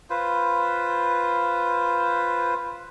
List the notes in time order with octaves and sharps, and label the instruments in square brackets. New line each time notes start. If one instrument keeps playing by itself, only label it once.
[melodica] F4 B4 C5